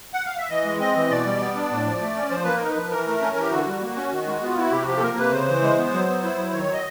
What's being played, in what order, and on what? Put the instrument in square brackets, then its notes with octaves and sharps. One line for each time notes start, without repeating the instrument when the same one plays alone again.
[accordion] F#5
F5
E5
E3 D#5
G#3
C4 D#5
E3
B2 D5
G3
B3
D4
A2
F3
A3
C#4
F3 C5
A#3 B4
D#4 A#4
B4
F3
E3 A#4
A3
C#4
E3 G4
D3 F#4
G3
A#3
C#4
D#3
G#3
B3 F4
E4 F#4
C3 G4
F#4
F3 G4
A4
A#3 A#4
C3 B4
C#3 C5
E3
G#3
B3
F#3
B3
E4
F#3
D#3 C#5
F#3
D#5